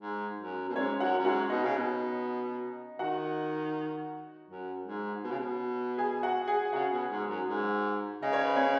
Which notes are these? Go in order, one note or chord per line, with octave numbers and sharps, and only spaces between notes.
G#2
F#2
B2
G#2 C#4 C#5
F#2 F#4 F#5
F#2
G#2 F#4 F#5
B2 D#4 D#5
C#3
B2
D#3 F#4 F#5
F#2
G#2
B2
C#3
B2
G#4 G#5
F#4 F#5
G#4 G#5
C#3 F#4 F#5
B2
G#2
F#2
G#2
C#3 D#5
C#5
B4
C#4 C#5